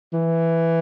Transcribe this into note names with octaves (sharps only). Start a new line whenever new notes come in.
E3